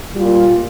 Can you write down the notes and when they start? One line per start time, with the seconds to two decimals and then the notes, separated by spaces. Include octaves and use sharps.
0.15 A#2 G3 F4